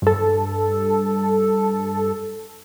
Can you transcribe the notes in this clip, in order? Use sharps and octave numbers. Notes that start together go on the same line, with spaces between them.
G2 A4